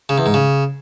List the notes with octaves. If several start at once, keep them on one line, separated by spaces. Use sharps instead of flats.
C#3
E2
G#2
C#3